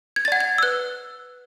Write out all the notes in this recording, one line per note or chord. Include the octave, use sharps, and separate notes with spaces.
G#6
A6
D5 F#5 G#6
G#6
E6
B4 F#6